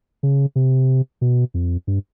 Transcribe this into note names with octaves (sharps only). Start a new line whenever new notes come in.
C#3
C3
B2
F2
G2